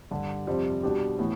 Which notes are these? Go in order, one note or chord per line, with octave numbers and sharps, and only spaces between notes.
G2 D3 G3 D4
F2 C3 G3 C4
B2 G3 D4 G4
A2 E3 B3